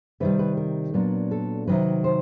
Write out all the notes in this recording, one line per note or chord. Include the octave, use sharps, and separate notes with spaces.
C3 D#3 G3 B4
B4
A#4
A#2 F#3 B3 D4
A4
C3 D#3 F#3 B4
C5